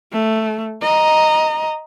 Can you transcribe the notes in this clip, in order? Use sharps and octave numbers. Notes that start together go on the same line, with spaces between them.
A3
D#5 A#5